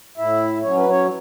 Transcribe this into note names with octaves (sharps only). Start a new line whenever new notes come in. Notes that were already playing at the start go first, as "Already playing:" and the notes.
A2 E4 E5
F#3 C#4 C#5
B4
C#4 C#5